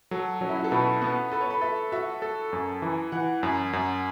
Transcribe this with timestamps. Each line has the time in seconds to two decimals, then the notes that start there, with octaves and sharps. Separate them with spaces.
0.11 F#3 A4
0.41 F#3 C#4
0.49 E4
0.56 F#4
0.64 A4
0.71 B2 B4
1.02 B3
1.32 A4 B4
1.41 C#5
1.50 B4
1.61 A4 E5
1.92 F#4 E5
2.22 A4
2.53 F#2
2.82 E3
3.12 E3 F#5
3.43 F#2
3.73 F#2